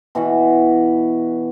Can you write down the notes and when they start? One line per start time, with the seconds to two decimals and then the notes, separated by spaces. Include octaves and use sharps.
0.15 B2 E3 F#4 F#5